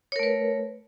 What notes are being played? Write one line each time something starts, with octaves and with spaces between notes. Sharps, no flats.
A3 A#4 B4 C#5